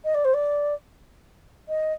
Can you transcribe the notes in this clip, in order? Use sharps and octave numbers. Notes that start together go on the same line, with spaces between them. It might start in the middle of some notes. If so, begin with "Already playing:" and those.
D#5
D5
C5
D5
D#5